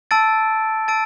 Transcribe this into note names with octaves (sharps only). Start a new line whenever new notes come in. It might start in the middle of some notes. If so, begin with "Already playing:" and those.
A5 E6 A6 D7
A5 E6 A6 D7